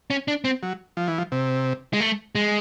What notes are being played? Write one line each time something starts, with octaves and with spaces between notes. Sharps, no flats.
C#4
D4
C4
F#3
F3
E3
F3
C3
G#3
A3
G#3